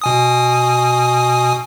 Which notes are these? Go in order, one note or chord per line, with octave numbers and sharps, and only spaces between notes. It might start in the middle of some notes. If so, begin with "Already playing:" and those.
B2 G#5 D#6